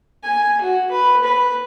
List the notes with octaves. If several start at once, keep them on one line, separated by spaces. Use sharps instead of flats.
G#5
F#4
B4
B4